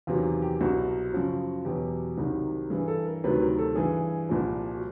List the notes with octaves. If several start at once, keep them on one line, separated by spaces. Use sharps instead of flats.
E2 C3 D#3 F#3 F4
G4
C2 B2 F#3 F#4
F#2 C#3 F3
E2 B2 F#3 G4
C2 C3 D#3 F#3
G2 E3 G#4
A4
A#4
D2 C3 D#3 F#3 B4
A#4
A4
G2 E3 G#4
C2 A#2 F3
F#4